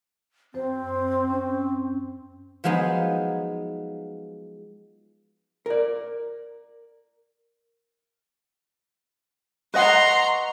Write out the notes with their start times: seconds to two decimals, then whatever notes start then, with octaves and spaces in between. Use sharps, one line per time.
0.54 F#2 C4 C5
1.30 C#4
2.64 F3 F#3 G#3 B3 D#4
5.66 A#4 D5
9.74 B4 D#5 F#5 A#5 C6 C#6